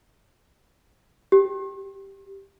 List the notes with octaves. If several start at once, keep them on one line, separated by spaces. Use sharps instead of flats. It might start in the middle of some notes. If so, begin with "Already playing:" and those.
G4